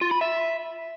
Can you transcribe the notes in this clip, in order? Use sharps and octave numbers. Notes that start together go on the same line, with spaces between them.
F4
B5
E5